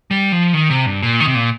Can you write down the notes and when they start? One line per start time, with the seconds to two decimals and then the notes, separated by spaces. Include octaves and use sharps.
0.11 G3
0.32 F3
0.53 D#3
0.70 C3
0.86 G2
1.03 A#2
1.20 D#3
1.27 C3
1.35 A#2